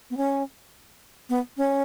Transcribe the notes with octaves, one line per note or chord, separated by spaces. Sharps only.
B3
C#4
B3
C#4